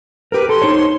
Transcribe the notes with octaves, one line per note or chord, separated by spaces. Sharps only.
G4 A#4 B4
A4 C6
D#4 C5 C#5